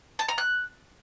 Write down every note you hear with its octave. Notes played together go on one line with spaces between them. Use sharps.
A5
A#5
F#6